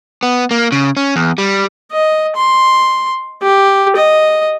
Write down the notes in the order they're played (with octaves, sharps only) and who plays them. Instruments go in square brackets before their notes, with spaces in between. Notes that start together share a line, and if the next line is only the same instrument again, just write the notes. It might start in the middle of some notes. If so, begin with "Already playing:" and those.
[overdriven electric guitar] B3
A#3
C#3
C#4
E2
G3
[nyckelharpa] D#5
C6
G4
D#5